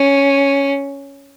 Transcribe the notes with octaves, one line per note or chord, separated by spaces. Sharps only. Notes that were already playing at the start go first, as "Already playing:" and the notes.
Already playing: C#4